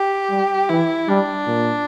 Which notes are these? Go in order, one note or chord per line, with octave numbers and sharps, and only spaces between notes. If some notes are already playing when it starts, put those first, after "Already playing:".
Already playing: G4
G3
E3 E4
G3 D4
A#2